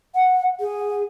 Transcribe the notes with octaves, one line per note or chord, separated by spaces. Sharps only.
F#5
G#4